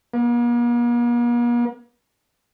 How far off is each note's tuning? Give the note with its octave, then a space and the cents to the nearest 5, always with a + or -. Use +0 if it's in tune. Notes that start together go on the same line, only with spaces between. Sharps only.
A#3 +45